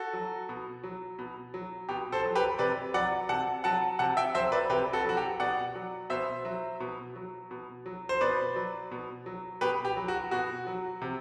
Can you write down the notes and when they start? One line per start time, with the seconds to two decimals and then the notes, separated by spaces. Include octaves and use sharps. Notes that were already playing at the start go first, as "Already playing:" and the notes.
Already playing: F#4 A4
0.13 F#3
0.49 B2
0.83 F#3
1.19 B2
1.54 F#3
1.89 B2 G4
2.12 A4 C5
2.24 F#3
2.35 G4 B4
2.59 C3 B4 D5
2.94 F#3 D5 F#5
3.29 C3 F#5 A5
3.64 F#3 F#5 A5
3.99 C3 F#5 A5
4.17 E5 G5
4.35 F#3 C5 E5
4.52 B4 D5
4.70 C3 G4 B4
4.93 F#4 A4
5.04 F#3 F#4
5.17 G4
5.40 B2 D5 F#5
5.75 F#3
6.10 B2 C5 E5
6.45 F#3
6.80 B2
7.15 F#3
7.51 B2
7.86 F#3
8.09 C5
8.21 B2 B4 D5
8.56 F#3
8.91 B2
9.26 F#3
9.61 B2 G4 B4
9.85 G4
9.96 F#3
10.08 F#4
10.31 B2 F#4
10.67 F#3
11.02 C3